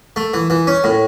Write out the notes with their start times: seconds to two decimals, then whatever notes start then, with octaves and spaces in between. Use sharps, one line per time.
0.16 A3
0.34 E3
0.50 E3
0.67 C#4
0.84 A2